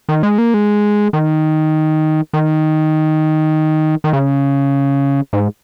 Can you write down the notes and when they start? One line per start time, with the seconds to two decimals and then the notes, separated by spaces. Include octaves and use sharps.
0.09 D#3
0.23 G#3
0.38 A#3
0.54 G#3
1.13 D#3
2.33 D#3
4.04 D#3
4.13 C#3
5.33 G#2